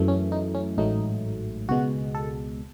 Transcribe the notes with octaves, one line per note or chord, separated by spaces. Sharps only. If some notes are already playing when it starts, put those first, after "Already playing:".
Already playing: F#2 E3 A3
C#4
D#4
C#4
A1 G#2 F#3 A3 D#4
C#2 B2 G#3 F#4
A4